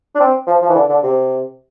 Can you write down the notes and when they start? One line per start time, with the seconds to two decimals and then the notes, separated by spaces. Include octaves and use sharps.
0.15 D4
0.20 C4
0.47 F3
0.62 F3
0.69 E3
0.75 D3
0.89 D3
1.03 C3